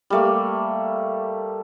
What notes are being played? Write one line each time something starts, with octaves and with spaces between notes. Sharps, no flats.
G3 A3 A#3